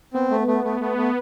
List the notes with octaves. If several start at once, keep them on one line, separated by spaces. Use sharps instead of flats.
B3 C4
A3
A3
A3
A3
A3